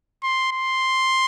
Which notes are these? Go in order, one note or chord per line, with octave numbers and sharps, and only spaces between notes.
C6
C6